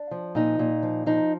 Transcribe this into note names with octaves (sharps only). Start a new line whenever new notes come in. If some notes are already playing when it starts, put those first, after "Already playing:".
Already playing: D4
F3
A#2 D#4
A#2
F3
F3 D#4